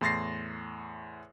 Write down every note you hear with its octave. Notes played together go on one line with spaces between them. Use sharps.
E2 A2 C6 A6 A#6 C7